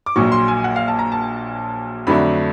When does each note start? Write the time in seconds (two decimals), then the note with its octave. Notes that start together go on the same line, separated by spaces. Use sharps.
0.06 D6
0.16 A#1 A#2 F#3 C#6
0.32 C6
0.48 G#5
0.64 F#5
0.76 F5
0.88 A5
0.99 A#5
1.12 A5
2.07 F2 D3 F#3 A3 D4 B5